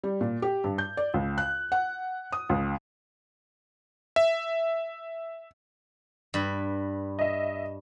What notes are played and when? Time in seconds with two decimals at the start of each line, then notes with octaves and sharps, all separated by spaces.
0.04 G3
0.21 A#2
0.42 G4
0.64 G2
0.78 G6
0.97 D5
1.14 C#2
1.38 F#6
1.72 F#5
2.32 D#6
2.49 C#2
4.16 E5
6.34 G2 B4
7.19 D#5 E5